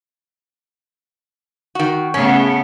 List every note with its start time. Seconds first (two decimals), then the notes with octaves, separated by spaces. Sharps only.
1.75 D#3 F#4
2.14 C#3 A3 B3 C#4